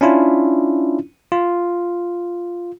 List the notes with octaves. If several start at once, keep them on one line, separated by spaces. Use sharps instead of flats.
C#4 D4 E4 F4
F4